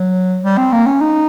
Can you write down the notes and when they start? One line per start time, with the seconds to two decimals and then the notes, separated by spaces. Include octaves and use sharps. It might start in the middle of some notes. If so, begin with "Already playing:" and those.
Already playing: F#3
0.44 G3
0.58 C4
0.72 A#3
0.86 C#4
1.01 D#4